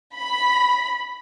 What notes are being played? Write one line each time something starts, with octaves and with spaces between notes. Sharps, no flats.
B5